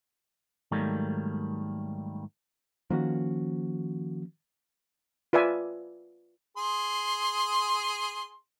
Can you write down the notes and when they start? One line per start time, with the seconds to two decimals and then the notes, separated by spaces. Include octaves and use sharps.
0.72 G#2 D#3 F#3 G3 A3 A#3
2.90 D#3 F3 A#3 C#4 F#4
5.33 F4 B4 D5 E5 G#5
6.57 G#4 C6